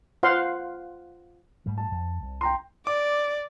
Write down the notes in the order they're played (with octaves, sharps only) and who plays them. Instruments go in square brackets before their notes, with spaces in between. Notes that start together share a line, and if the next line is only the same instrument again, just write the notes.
[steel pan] F4 C5 F5 F#5 C6
[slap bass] G#2 G3 A3
[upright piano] A5
[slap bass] F2
C2
[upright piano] G5 A#5 C6
[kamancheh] D5 [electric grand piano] D6